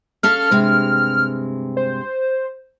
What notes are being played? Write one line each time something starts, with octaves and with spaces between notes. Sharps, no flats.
C#4 A4 F5 F6
G2 C3 G#3
C5